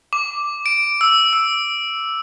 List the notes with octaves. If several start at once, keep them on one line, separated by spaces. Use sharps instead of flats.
D6
D7
E6
E6